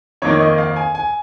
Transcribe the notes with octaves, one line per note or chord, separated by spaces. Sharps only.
F2 D#3 A#3 D#4 C#5
D#5
F5
G#5
G#5